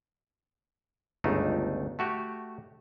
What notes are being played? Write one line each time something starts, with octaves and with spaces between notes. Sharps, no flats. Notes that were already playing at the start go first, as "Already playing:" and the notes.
G1 C#2 A3 D4 D#4
A3 F#4 G4